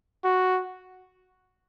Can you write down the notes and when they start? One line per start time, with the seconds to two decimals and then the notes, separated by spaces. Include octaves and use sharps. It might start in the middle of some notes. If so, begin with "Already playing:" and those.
0.24 F#4